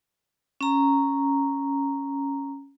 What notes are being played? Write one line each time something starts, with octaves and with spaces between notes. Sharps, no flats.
C#4 A#5